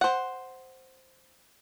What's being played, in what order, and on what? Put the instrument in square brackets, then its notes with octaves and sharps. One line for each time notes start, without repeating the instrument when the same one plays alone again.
[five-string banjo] C5 F#5